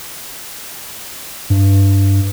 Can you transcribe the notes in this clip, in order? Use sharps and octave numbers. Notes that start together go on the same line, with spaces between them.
G2